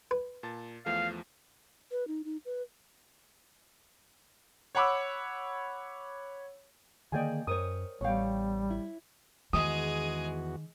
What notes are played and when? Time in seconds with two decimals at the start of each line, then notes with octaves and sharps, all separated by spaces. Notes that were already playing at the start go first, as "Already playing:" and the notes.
0.11 B4
0.43 A#2 A5 A6
0.86 E2 F3 A3 F5
1.91 B4
2.08 D#4
2.25 D#4
2.45 B4
4.75 C#5 F#5 B5 D6 E6
7.12 D3 D#3 A#3 G#4 D5 D#5 G5 G#5
7.47 F#2 A#4 C5 C#5 D#6
8.01 A1 G3 B3 C#5 F5 G5
8.70 E4
9.53 E2 D#3 G#3 F#4 G#4 D#6